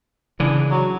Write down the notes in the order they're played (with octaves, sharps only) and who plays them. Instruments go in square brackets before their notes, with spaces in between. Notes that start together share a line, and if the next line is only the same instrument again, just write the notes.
[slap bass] C#3 E3 [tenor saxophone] D4
[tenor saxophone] F#3